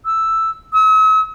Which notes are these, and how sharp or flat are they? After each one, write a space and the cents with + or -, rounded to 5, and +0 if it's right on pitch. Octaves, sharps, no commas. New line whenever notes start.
E6 +0
E6 -45